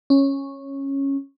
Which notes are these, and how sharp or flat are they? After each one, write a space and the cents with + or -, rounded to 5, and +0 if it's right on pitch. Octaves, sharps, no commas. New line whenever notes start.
C#4 -10